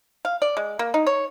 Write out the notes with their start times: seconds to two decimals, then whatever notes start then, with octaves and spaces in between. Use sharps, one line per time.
0.25 F5
0.42 D5
0.57 G#3
0.79 A#3
0.94 D#4
1.07 C#5